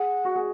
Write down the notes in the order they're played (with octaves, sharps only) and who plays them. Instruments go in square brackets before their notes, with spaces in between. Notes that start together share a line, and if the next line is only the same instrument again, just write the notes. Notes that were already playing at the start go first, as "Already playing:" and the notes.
Already playing: [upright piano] G#4 [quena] F#5
[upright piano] F#4
G#4